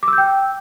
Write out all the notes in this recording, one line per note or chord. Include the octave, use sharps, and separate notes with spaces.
D6
E6
G6
G5